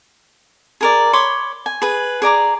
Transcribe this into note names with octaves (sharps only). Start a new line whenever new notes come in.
G#4 A#4 D5
C#5 B5 C6 D6
G#5
G#4 B4
G#4 D5 A#5 D6